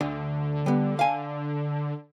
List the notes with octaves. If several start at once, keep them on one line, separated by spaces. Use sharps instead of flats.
D2 D3
G3 B3
F5 G#5